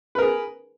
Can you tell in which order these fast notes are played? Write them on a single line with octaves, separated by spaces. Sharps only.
B4 A#4 G#4